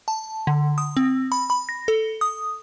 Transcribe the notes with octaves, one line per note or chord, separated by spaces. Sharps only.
A5
D3
D#6
C4
B5
B5
A#6
A4
D#6